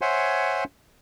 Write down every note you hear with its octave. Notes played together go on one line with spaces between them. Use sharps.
C5 C#5 E5 F#5 G#5 C6